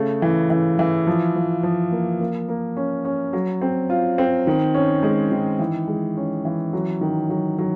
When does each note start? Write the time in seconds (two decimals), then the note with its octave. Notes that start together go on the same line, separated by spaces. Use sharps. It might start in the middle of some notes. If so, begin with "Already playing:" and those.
Already playing: C#3 A3
0.22 E3
0.50 E3
0.79 E3
1.07 F3
1.36 F3
1.63 F3
1.92 A#3
2.20 A#3
2.49 A#3
2.77 C#4
3.05 C#4
3.33 F#3
3.62 C4
3.90 F4
4.18 C4
4.47 D#3
4.75 C#4
5.03 G#3
5.32 D#3
5.59 E3
5.88 G#3
6.17 C#4
6.45 E3
6.73 F#3
7.01 D#3
7.29 F#3
7.59 F#3